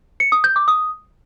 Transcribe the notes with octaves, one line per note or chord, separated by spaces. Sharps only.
C#7
D#6
G6
D6
D#6